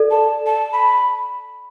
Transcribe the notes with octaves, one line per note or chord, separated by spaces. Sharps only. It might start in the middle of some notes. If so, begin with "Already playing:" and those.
Already playing: A4 D5
A5
A5
B5